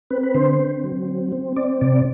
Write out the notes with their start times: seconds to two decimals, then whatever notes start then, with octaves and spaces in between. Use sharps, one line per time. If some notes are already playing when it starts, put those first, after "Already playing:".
0.11 C4 B4
0.23 B4
0.35 D3 C5
0.59 C4
0.84 F#3
1.08 C4
1.32 C4
1.56 C4 D5
1.81 C3 D5